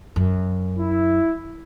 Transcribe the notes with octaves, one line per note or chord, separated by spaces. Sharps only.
F#2
E4